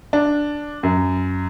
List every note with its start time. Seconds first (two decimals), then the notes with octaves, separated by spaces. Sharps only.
0.13 D4
0.83 F#2